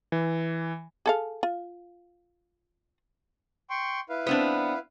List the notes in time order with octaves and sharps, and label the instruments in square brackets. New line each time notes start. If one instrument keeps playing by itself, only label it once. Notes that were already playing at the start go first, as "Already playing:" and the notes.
[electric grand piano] E3
[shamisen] G#4 A4 F5
F4
[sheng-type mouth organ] G5 C6 C#6
E4 B4 F5
[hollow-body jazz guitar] B3 C4 D4